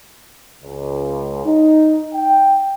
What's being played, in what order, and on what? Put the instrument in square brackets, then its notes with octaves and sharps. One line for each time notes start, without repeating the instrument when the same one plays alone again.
[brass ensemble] C#2
D#4
G5